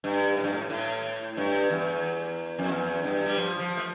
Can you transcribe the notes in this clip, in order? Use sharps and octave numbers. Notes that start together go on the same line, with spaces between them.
G2
A2
G2
A2
A2
G2
E2
F2
E2
G2
G3
F3
F3
A3